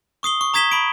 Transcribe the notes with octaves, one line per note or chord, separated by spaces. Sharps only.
C#6 D#6 C7 G7
C#6
A#5 D#6 G#6 B6 E7 G7
B5 D7